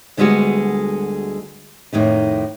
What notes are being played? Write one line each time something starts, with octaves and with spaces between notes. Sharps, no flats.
D2 D3 G3 G#3 B3 F#4
F2 A2 D#3 D#4